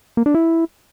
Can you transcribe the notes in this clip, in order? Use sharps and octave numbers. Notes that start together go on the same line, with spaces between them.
A#3
D4
E4